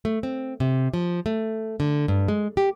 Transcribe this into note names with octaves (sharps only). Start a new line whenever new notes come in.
A3
C4
C3
F3
A3
D3
G2
G#3
G4